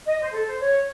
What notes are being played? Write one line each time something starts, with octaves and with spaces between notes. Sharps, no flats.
D#5
C5
A4
C5
C#5